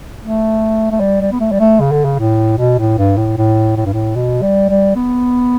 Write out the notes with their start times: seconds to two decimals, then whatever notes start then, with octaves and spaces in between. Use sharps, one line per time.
0.23 A3
0.91 A3
1.00 G3
1.21 G3
1.32 B3
1.40 A3
1.52 G3
1.60 A3
1.80 C#3
1.92 D3
2.05 C#3
2.19 A2
2.58 B2
2.79 A2
2.98 G2
3.17 A2
3.38 A2
3.77 A2
3.85 G2
3.93 A2
4.16 B2
4.42 G3
4.69 G3
4.96 B3